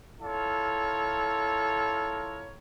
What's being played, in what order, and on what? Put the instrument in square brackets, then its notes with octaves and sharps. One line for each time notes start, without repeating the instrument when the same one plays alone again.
[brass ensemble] E4 F4 A4 A#4 C#5